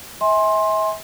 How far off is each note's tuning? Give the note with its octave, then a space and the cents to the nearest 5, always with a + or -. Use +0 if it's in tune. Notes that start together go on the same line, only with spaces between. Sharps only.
E5 -40 G#5 -5 C6 +15